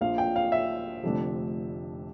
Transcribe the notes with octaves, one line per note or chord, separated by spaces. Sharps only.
A#1 A#2 F3 F5
G5
F5
E5
F1 F2 D3 A3 D4